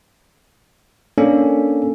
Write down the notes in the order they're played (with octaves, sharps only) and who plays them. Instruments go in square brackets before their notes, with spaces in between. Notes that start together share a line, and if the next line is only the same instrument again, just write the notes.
[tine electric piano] A#3 C#4 D4 A4